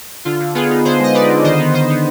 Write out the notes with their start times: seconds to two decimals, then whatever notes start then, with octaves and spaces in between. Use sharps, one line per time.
0.25 D3 F4
0.40 D3
0.55 B3 F4 G#4
0.70 D#4
0.85 D3 G#4 C5
0.99 G#3 D#5
1.14 D#4 B4 D5
1.30 D3
1.44 D#3 C5 D#5
1.60 B3
1.74 D#3 C5 D#5
1.90 B3